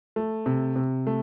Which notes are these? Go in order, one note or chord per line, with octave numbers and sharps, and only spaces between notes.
A3
C3
C3
A3